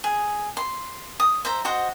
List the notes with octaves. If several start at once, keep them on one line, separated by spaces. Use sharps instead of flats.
G#4
C6
D#6
C5 E5 A#5
F#4 C5 D#5 F#5